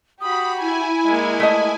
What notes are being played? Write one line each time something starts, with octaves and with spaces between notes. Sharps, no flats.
F#4 G4 B5 D#6
E4 G#5 B5
G#3 A#3
A3 D#5